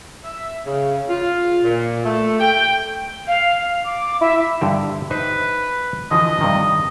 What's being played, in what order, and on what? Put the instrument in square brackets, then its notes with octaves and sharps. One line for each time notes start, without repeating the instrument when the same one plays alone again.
[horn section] E5
C#3
F4
A#2
A3
G5
[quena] F5
D6
[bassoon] E4 [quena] E5
[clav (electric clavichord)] G2 D3 G4
[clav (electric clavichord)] D#4 C5 E5 [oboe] B4
[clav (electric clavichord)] D3 E3 F3 [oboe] D#5
[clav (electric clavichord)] G2 C3 D#3